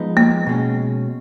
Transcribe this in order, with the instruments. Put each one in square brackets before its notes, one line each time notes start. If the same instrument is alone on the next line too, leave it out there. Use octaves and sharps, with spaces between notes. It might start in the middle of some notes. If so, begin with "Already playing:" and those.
Already playing: [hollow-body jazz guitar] F3 G#3 B3 D#4
[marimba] A#3
[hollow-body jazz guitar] B2 G#3 C#4